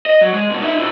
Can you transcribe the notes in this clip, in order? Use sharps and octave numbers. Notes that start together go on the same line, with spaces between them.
D#5
F#3
G#3
G2 B2
D#4 E5
B2 E4